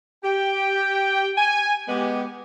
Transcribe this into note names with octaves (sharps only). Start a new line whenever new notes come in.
G4 G5
G#5
G#3 B3 G4